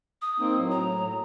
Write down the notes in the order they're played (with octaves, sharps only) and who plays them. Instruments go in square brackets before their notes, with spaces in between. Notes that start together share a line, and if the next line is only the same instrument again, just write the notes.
[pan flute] D#6
[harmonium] A#3 C4 D#4
A2 F#3
[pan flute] A#5